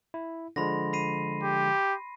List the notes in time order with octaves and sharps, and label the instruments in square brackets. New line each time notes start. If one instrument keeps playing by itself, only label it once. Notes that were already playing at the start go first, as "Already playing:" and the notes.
[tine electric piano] E4
[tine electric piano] D3 F3 G#3 [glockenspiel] B5 C6 A#6
[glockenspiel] B5 C7 D#7
[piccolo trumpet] G4